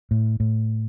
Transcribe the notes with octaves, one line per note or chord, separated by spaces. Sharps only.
A2
A2